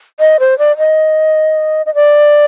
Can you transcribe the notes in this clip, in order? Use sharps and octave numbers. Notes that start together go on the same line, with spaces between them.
D#5
C5
D5
D#5
D#5
D5